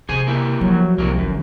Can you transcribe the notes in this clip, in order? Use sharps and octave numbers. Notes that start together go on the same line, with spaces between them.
C3 G#4 C5 G#5
A#3 E4 G4
F3 F#3
C2 C3 F#3 A#3
G1 F#2